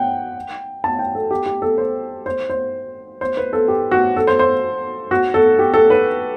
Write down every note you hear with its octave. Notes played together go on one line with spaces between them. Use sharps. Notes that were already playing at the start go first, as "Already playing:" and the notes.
Already playing: F#5 G5
A5
G5
A4
G4
G4
A4
C5
C5
C5
C5
B4
A4
G4
F#4
A4
C5
C5
F#4
A4
G4
A4
B4